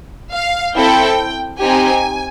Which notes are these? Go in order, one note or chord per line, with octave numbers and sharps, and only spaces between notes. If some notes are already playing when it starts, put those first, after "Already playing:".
F5
C4 E4 A4 G5
C4 D#4 G4 G#5